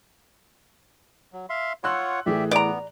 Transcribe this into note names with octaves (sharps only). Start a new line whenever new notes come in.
F#3
E5 F5 C6
F4 C#5 F#5 C6 E6 F#6
A2 E3 G4 G#4 D5 E5
B3 D5 A#5